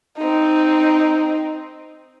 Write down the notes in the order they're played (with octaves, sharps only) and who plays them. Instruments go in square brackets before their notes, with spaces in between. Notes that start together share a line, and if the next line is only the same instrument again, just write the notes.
[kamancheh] C4 D#4